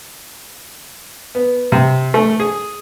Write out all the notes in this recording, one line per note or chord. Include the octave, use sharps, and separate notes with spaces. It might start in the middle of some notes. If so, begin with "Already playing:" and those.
B3
C3
A3
G#4